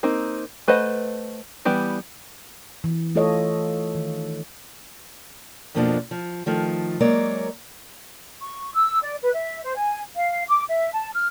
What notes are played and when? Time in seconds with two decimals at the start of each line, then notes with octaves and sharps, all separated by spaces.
0.03 A#3 C4 D#4
0.68 A3 B4 C5 D#5 F#5
1.65 E3 G3 B3 G4 D5
2.84 E3
3.15 A3 F4 A4 C#5 D#5
3.95 D#3
5.75 F2 B2 F3 A#3 C#4 D4
6.11 F3
6.46 D#3 F3 A3
7.00 F#3 G#3 A#3 A#4 C#5 D5
8.41 C#6
8.74 E6
9.01 D5
9.21 B4
9.33 E5
9.63 C5
9.76 G#5
10.15 F5
10.48 D6
10.69 E5
10.93 A5
11.13 F6